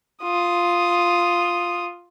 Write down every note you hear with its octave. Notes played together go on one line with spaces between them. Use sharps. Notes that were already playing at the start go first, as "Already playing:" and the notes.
F4 D#6